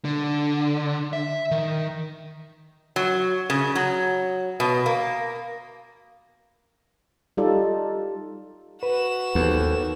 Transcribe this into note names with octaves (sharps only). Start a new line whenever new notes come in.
D3
E5
D#3
F#3
C#3
F#3
B2
A#3
G3 D#4 F4 A4 D5
F#4 B4 E7
D#2 B3 C4 A4